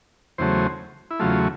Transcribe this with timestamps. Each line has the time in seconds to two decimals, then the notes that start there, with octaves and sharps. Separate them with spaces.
0.38 E2 C#3 F#3 A3 C5
1.11 E4
1.20 E2 C#3 F#3 A3 F4